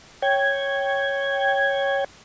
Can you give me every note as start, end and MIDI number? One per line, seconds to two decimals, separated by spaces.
0.22 2.04 73
0.22 2.04 79
0.22 2.04 92